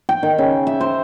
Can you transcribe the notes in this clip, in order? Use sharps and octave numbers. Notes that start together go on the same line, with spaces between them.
G5
D#3
C#3
E5
C5